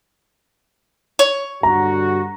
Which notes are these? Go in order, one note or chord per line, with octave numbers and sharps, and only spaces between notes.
C#5
G2 D3 F#4 A#5